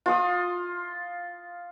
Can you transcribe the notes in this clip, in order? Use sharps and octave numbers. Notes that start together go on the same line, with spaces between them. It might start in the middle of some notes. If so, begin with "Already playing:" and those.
F4 C6 D#6